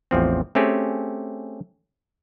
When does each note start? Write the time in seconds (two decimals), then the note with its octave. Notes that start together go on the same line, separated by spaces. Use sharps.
0.11 A1 E2 F3 C4
0.55 A3 C4 C#4 G4 G#4